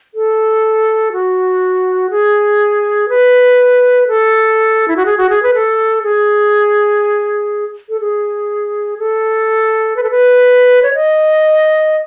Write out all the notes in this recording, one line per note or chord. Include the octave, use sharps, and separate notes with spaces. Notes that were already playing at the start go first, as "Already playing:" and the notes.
A4
F#4
G#4
B4
A4
E4
F#4
G#4
F#4
G#4
B4
A4
G#4
A4
G#4
A4
B4
A4
B4
C#5
D#5